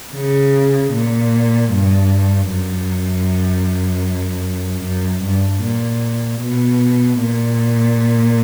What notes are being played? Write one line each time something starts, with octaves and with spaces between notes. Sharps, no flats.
C#3
A#2
G2
F#2
F#2
G2
A#2
B2
A#2